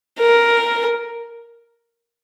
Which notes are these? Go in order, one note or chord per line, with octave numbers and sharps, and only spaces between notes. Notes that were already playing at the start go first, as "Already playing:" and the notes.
A#4